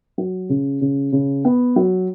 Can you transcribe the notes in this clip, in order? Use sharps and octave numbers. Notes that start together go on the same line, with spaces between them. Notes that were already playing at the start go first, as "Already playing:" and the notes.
F#3
C#3
C#3
C#3
B3
F#3